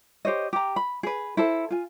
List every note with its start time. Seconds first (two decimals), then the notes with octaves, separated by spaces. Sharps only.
0.25 G4 C5 C#5 D#5
0.53 G4 A#5
0.76 B5
1.03 G#4 B4
1.37 E4 A4 C5
1.71 F4 G#5